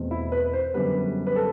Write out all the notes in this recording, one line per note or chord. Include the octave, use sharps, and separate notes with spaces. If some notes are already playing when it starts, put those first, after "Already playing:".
Already playing: E2 B2 A3 C4
E4
B4
C5
F#2 D3 G3 B3 B4
B4
A4